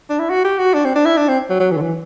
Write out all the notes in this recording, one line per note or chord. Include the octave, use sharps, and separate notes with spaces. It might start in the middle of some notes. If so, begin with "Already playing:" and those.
D4
E4
F#4
G4
F#4
D4
C4
D4
E4
D4
C4
F#3
F#3
E3
D3
E3